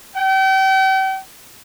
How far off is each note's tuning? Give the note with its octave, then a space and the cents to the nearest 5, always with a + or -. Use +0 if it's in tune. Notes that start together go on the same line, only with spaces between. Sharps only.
G5 -40